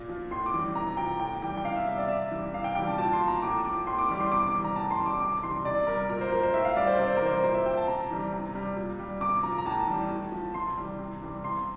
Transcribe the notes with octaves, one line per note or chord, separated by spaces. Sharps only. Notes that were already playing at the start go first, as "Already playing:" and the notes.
Already playing: A#2
F3
A2 C6
D6
E3 G3
C3 A#5
F3 G5
A2 G5
E3 G3 G5
G5
C3 F5
E5
G3 E5
D5
C3 E5
E3 G3
C3 F5
G5
E3 G3 G5
A5
A#2 A5
C6
F3
A#5
A2 D6
F3 D6
A2 C6
D6
E3 G3 D6
C6
C3 D6
D6
E3 G3
A#5
A2 A5
C6
E3 G3
D6
C3 D6
E3 G3 C6
C3 D5
G3 A#4
A#2 A#4
C5
F3 A#4
C5
A2 E5
F5
G3 D5
C5
C3 D5
C5
A#4
E3 G3 C5
A#2 C5
E5
F3 G5
A5
C3 A#5
E3 G3
C3
G3
A#2
G3
C3 D6
F3 A#5
A#5
A2 A5
E3 G3
A2
F3
C3 C6
E3 G3
C3
E3 G3
C3 C6